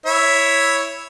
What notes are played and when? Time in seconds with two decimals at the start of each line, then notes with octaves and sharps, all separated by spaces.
0.06 E4 C#5 E5